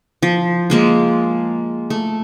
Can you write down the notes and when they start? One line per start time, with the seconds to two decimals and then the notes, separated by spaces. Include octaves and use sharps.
0.23 F3
0.70 G#3 A#3 F4
1.90 A3